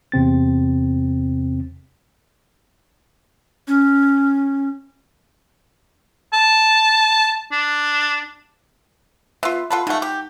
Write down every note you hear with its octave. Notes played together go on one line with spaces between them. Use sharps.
E2 C3 C4 A6
C#4
A5
D4
B3 F4 E5
F4 A4 B4 F#5 A5
C#3 A3 D#4 F#5
G4